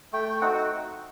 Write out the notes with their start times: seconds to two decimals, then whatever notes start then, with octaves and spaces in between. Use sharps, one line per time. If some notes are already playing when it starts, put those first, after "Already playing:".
0.13 A3 G5
0.41 C4 D#4 F#4 F#5